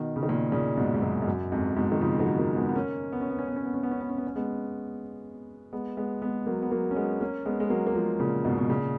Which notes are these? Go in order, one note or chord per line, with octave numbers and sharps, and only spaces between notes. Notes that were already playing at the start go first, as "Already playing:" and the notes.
Already playing: B2 D#3
C#3
D#3
A#2 C#3
A#2 C#3
G#2 B2
G#2
F#2 A#2
G#2
F#2
F2 G#2
G#2 B2
D#3
C#3 F3
D#3 F#3
F#3 A#3
G#3 B3
B3
A#3 C#4
B3
C#4
B3
C#4
B3
C#4
B3
C#4
B3
C#4
B3
C#4
B3
C#4
G#3 B3
G#3 B3
G#3 B3
G#3 B3
F#3 A#3
B3
F#3 A#3
C#4
G#3 B3
A#3 C#4
G#3 B3
G#3
F#3 A#3
A#3
F3 G#3
A#2 C#3
G#2 B2
B2
A#2 C#3